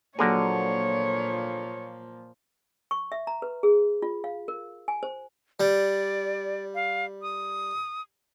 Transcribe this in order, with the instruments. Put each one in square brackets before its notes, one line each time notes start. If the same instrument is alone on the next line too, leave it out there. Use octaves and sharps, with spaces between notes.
[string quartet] A#2 F3 [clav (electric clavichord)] D3 A#4 [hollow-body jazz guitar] F#3 A#3 G#4 [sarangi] C#5
[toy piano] C#6
E5
A#5
B4
G#4
F4
F5
A#4
G#5
C5
[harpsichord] G3 [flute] D5
[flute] F5
D#6